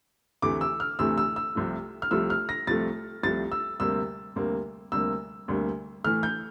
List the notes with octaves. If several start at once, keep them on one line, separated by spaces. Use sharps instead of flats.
D2 C3 E3 A3 D6
E6
F6
D2 C3 E3 A3 E6
E6
E6
C2 C3 F3 A3
F6
C2 C3 F3 A3 E6
F6
A#6
C2 C3 F3 A3 A6
C2 C3 F3 A3 A6
E6
D2 C3 G3 A#3 E6
D2 C3 G3 A#3
D2 C3 G3 A#3 E6
D2 C3 G3 A#3
A2 E3 A3 F6
G6